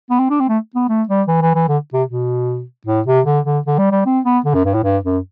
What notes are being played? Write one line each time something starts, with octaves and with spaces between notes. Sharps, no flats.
B3
C4
D4
C4
A3
B3
A3
G3
E3
E3
E3
D3
C3
B2
A2
C3
D3
D3
D3
G3
G3
C4
B3
D3
F#2
G2
A2
G2
F#2